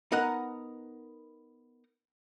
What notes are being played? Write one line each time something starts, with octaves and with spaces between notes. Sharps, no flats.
B3 D#4 A#4 D#5 F#5